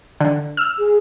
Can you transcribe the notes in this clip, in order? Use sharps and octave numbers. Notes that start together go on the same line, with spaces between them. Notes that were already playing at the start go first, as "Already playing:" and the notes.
D3
E6 F6
G#4